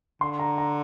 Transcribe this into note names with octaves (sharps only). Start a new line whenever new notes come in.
D3 C6
A#5
A#5